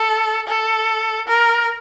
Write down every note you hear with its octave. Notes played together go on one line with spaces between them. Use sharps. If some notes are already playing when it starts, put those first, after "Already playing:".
Already playing: A4
A4
A#4